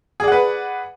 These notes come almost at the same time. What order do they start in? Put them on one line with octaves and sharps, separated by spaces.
G#4 D5 F#5 B4